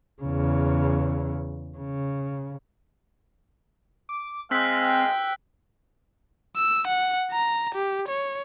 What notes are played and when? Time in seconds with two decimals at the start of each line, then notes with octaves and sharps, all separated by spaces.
0.22 E2 C#3
1.78 C#3
4.09 D6
4.51 G#3 C4 F5 E6 F#6 B6
4.84 G5
6.57 E6
6.88 F#5
7.32 A#5
7.75 G4
8.09 C#5